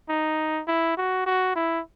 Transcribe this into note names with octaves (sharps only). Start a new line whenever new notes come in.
D#4
E4
F#4
F#4
E4